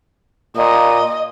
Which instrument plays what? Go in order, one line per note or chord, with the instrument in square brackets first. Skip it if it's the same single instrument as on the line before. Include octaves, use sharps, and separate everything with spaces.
[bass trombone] A#2 [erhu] D#5